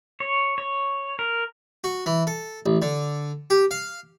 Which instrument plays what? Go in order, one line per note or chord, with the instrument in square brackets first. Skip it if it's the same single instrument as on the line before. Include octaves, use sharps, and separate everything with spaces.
[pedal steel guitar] C#5
C#5
A#4
[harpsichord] F#4
E3
A4
A1
D3
G4
F5